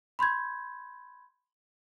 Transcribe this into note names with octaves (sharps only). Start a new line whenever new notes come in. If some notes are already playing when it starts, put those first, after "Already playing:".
B5 C6 G6 G#6